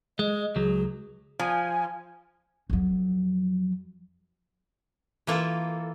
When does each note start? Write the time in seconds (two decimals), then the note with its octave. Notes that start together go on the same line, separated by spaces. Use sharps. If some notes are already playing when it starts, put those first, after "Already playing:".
0.19 G#3 D#5
0.56 C#2 F#3 G#4
1.39 F3 G#5
2.70 F2 F#3
5.27 E3 A#3 F4 A4